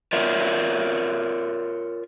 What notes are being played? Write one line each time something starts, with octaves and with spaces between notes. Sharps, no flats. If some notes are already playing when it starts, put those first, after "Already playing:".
F4 A#4 C#5 D5 E5